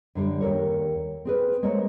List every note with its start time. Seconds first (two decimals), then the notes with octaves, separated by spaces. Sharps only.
0.15 F#2 D3 G3
0.40 D#2 A4 A#4 C#5
1.25 C4 G#4 B4
1.63 G#3 A#3 C4 A4 C5 C#5